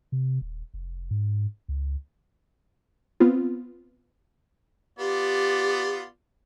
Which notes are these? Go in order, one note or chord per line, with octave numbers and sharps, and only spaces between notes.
C3
D#1
F1
G#2
C#2
B3 C4 F4
B3 F4 G4 D5